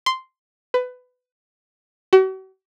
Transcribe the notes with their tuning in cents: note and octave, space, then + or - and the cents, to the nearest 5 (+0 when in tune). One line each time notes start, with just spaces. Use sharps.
C6 -5
B4 +20
F#4 +45